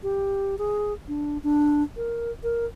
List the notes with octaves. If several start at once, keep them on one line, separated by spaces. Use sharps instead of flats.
G4
G#4
D4
D4
A#4
A#4